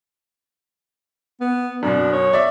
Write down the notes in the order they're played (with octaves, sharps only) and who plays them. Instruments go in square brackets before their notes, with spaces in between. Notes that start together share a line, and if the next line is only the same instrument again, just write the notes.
[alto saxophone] B3
[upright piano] F#2 B2 [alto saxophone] D4
[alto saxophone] C#5
[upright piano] D5 E5